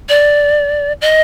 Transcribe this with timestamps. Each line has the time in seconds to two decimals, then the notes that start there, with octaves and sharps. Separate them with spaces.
0.09 D5
1.01 D#5